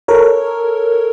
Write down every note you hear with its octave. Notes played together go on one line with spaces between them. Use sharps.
A4 A#4 C#5